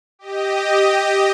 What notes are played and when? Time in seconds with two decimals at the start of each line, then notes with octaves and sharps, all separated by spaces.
0.19 G4 D#5